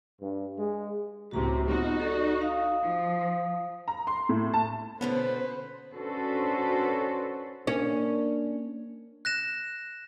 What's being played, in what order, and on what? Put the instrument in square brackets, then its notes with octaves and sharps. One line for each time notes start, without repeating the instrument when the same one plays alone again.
[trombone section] G2
G#3
[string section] C#2 A2 C3 [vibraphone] F#4 A#5
[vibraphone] B3 F4 F#5 [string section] D#4 F#4
[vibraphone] A4 D5
F5 D#6
[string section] F3
[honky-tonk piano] A#5
C6
A2
A5
[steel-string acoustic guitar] B2 D3 C#4 [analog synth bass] B3 [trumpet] B4 [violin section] C5
[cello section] C#4 D4 F#4 A4 B4 C5
[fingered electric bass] A#3 [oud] C#4 [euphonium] D4
[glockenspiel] F#6 A#6 E7